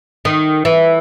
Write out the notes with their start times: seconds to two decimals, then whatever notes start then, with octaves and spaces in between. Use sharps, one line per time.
0.25 D#3
0.65 E3